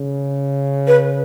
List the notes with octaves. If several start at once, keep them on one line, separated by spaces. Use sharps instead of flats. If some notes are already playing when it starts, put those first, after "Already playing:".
Already playing: C#3
B4